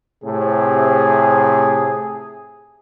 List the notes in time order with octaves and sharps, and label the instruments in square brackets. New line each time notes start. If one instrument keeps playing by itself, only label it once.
[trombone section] A2 C3 [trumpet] G#4